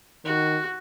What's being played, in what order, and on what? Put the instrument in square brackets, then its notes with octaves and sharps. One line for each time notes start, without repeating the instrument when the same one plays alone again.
[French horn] D#3 [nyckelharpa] F#4